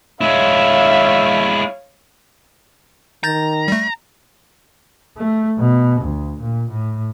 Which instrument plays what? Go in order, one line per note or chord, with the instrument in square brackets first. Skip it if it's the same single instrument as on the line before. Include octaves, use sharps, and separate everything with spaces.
[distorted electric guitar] G#3 E4 [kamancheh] C#5 F5 [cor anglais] E5
[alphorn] D#3 [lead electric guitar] A#5 [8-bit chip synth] G6 A6
[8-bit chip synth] G3 A3
[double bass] A3
B2
D2
A#2
A2